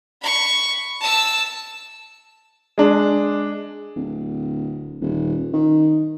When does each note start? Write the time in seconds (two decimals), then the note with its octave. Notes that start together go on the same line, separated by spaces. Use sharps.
0.22 B5 C#6
1.01 A5 E6
2.78 G#3 D4
3.95 D1
5.01 D#1
5.53 D#3